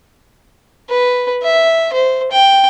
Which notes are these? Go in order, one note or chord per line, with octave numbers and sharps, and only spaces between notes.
B4
E5
C5
G5